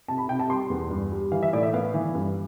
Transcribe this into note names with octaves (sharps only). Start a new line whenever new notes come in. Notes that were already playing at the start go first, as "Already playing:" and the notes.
C3 A5
B5
C3 G5
A5
G3 C6
E2
G2
G3
E3 F5
E5
A2 D5
E5
B3 F5
E3
G2